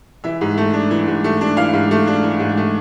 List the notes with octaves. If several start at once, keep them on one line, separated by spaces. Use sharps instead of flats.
E3 E5
G#2
A3
D4
E3
G#2
A3
D4
E3 F5
G#2
A3
D4
E3
G#2
A3